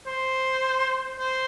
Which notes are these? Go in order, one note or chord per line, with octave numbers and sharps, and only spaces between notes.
C5
C5